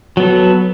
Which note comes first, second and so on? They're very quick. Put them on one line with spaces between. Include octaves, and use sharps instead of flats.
F#3 B3 A4